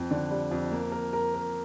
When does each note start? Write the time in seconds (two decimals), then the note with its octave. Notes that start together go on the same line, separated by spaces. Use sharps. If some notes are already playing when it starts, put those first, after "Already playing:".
Already playing: F2
0.11 D3
0.31 G3
0.51 F2
0.71 A#3
0.92 A#4
1.13 A#4
1.34 A#4